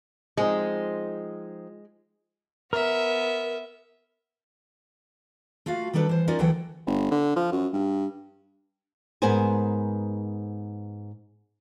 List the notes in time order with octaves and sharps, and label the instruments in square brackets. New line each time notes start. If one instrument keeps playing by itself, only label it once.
[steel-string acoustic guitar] F3 C4 D#4 [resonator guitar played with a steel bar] G#3
[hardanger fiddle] B3 E5 [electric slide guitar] A#4
[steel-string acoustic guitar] A3 F4 F#4 F5
D#3 G3 D4 A4 B4
E3 C5
C#4 D#4 F4 A#4 D5
D2 E3 F#3 A4 F#5 G5
[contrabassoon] G1
D3
F3
F#2
G2
[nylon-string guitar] G#2 B3 G#4 A#4 C5 G#5